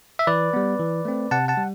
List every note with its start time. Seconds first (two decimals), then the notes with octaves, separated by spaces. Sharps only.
0.19 E5
0.27 E3 B4 D5
0.54 G3 B3
0.79 E3
1.05 A3 C4
1.31 C3 F#5 A5
1.48 F#5 A5
1.57 G3